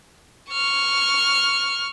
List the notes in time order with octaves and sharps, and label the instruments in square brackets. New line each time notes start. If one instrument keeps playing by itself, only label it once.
[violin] C#6 F6